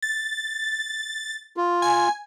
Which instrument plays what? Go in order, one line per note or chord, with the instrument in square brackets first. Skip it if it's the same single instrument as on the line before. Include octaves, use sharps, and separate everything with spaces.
[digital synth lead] A6
[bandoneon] F4
[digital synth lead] G#5